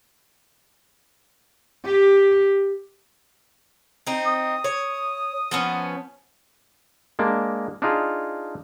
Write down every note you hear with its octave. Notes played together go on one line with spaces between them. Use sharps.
G4
C4 D#4
D#6
C#5
F3 B3 C#4
G#3 A#3 D4
D4 D#4 F4 G#4